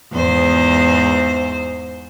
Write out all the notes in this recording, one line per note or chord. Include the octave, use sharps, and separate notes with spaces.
E2 G#2 C5